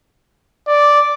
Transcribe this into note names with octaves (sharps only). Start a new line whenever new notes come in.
D5